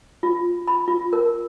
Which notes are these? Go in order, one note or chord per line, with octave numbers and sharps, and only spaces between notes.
F4
B5
F4
A#4